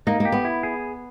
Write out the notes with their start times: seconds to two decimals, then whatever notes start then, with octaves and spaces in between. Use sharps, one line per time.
0.07 A#3 D#4
0.20 A#3
0.25 G4
0.32 B3
0.45 E4
0.63 G#4